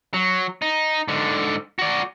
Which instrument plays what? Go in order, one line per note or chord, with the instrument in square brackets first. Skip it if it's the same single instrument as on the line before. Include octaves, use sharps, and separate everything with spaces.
[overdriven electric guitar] F#3
D#4
G#2 D3
F#4 D5